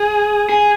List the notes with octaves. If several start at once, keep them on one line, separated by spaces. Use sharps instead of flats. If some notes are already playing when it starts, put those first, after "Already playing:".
Already playing: G#4
G#4